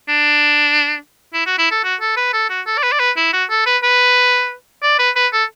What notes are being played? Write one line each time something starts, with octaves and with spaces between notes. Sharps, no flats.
D4
E4
F#4
E4
A4
F#4
A4
B4
A4
F#4
A4
D5
B4
D5
B4
E4
F#4
A4
B4
B4
D5
B4
B4
A4